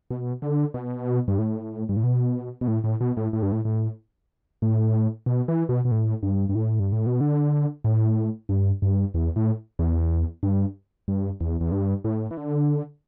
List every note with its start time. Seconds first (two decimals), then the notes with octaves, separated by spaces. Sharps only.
0.11 B2
0.42 D3
0.74 B2
1.28 G2
1.39 A2
1.89 G2
1.96 A2
2.04 B2
2.61 B2
2.68 A2
2.84 A2
3.01 B2
3.17 A2
3.33 A2
3.43 G2
3.52 A2
3.65 A2
4.62 A2
5.26 B2
5.48 E3
5.69 B2
5.85 B2
5.92 A2
6.23 G2
6.49 G2
6.55 A2
6.80 G2
6.92 A2
7.06 B2
7.21 D3
7.84 A2
8.49 G2
8.82 G2
9.14 E2
9.36 A2
9.79 E2
10.43 G2
11.08 G2
11.41 E2
11.61 E2
11.72 G2
12.05 A2
12.31 E3
12.37 D3